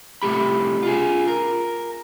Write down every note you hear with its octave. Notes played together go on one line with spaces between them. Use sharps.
C2 C3 A3 G4 B5
F4 G#4
A#4